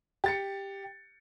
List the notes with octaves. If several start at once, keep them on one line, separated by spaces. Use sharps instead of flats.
G4 A6 C#7